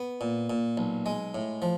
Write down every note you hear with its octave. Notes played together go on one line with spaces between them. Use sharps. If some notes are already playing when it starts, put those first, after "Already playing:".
Already playing: B3
A#2
A#2
B1
G#3
A2
F3